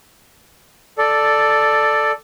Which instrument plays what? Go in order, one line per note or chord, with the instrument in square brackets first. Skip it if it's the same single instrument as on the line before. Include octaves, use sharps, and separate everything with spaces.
[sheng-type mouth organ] A4 D5